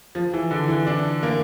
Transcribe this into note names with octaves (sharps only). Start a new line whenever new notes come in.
F3
E3
D3
E3
D4
A#3